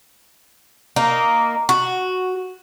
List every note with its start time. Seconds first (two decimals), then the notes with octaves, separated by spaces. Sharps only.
0.96 A#3 D#4
1.69 F#4